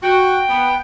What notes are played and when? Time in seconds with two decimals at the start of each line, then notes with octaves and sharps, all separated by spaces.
0.03 F#4 G5
0.50 B3